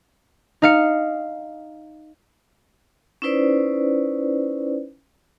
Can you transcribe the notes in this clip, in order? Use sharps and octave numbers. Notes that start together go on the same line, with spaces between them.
D#4 F5 C#7
C#4 D#4 E4 B4 C5 D5